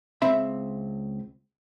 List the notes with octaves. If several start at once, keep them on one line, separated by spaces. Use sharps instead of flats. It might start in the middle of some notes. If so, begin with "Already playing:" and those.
C#2 C4 E5 B5